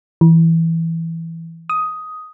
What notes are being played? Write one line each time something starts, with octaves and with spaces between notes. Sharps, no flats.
E3
D#6